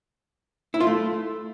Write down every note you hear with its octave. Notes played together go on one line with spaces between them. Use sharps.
E4
F4
A3